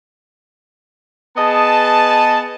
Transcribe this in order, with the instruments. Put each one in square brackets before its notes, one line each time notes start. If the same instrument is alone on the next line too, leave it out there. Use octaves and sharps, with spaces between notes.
[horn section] B3 G#4 D#5 A5